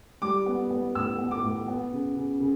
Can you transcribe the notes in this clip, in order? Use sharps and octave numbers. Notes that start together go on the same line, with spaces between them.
G3 D6
B3
B3
A2 E6
B3
D6
A2
B3
C#3
C#3
C#3